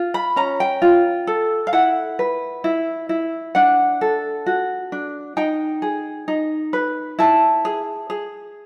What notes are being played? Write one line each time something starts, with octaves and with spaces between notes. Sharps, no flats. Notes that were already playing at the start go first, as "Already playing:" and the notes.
Already playing: F4
B5
C#4 A#5
G5
F4
A4
F5
E4 F#5
B4
E4
E4
D4 F#5
A4
F#4
D4
D#4 G5
G#4
D#4
B4
E4 A5
G#4
G#4